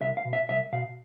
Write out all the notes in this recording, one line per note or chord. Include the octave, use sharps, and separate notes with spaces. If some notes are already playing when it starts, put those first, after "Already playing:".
C2 E5
F5
B2
E5
C2 E5
B2 F5